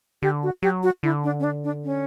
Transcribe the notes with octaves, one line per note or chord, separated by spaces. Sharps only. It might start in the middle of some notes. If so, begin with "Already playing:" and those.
D3 G4
F#4
F#3 G4
F#4
D3 E4
D4
C#4
D4
D4
C#4